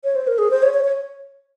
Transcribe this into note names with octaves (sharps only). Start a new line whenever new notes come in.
C#5
C5
A#4
G#4
C5
C#5
C#5
C#5